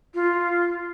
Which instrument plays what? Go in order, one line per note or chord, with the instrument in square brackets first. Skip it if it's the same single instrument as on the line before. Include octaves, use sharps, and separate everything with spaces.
[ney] F4